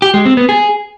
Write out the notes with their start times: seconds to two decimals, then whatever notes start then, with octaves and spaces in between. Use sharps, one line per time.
0.02 G4
0.14 G#3
0.25 C4
0.37 B3
0.49 G#4